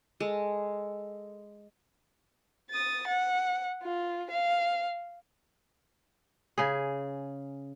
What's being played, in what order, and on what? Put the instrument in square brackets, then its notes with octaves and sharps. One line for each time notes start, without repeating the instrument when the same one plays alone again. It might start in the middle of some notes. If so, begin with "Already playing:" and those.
[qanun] G#3 A4
[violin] D#6 A6
F#5
F4
F5
[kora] C#3 G#4